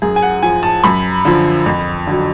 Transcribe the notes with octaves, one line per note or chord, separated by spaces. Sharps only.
F#2 G#4
G#5
F#5
F3 G#5
A5
F#2 B5
D3 F3
F2
D3 F#3